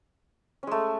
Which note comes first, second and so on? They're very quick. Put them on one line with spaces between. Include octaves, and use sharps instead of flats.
C#4 G#3 A3